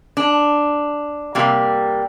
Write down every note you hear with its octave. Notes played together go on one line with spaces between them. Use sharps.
D4
C3 G3 A#3